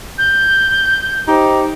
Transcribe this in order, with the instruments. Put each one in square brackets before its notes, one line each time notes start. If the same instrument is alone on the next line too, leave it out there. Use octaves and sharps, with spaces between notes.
[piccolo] G6
[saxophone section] D#4 G4 C5